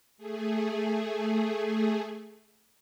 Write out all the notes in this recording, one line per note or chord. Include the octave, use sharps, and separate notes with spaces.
A3 G#4